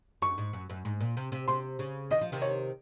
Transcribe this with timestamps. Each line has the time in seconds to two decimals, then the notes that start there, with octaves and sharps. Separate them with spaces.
0.22 F#2 C#6
0.38 G#2
0.53 F#2
0.70 F#2
0.85 G#2
1.01 A#2
1.17 C3
1.32 C3
1.48 C3 C6
1.79 C#3
2.11 D#3 D#5
2.21 F3
2.32 C3 D#3
2.42 C#5